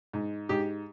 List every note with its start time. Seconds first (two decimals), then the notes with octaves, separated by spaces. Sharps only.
0.13 G#2
0.49 G#2 G4